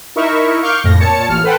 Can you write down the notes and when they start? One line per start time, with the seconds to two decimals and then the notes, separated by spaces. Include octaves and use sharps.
0.16 D#4 E4 A#4 E5 C#6
0.63 F5 C#6 D6 F6 G6
0.84 F2 A2 A#6
1.00 A#2 C#5 A5 C#7
1.29 A1 F6
1.43 A4 B4 C5 F#5 G5